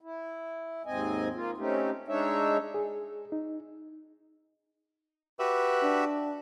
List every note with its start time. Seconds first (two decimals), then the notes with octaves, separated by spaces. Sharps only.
0.01 E4
0.85 D#2 G#2 C4 D#5 G#5
1.35 A#3 F4
1.58 A3 C4 C#4 D#4 G4
2.08 G#3 D4 D#4 C#5 E5
2.74 G#4
3.32 D#4
5.39 F#4 G4 B4 E5
5.83 D4